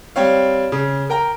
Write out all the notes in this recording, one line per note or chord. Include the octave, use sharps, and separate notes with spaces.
G3 C4 C#5 F5
C#3
A#4 G5 A#5